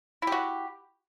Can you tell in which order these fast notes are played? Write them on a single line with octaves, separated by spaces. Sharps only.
E4 G4 F#4